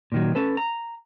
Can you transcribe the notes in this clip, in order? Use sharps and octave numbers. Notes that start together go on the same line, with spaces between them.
A#2 D#3 F#3
C#4 A4 B4
A#5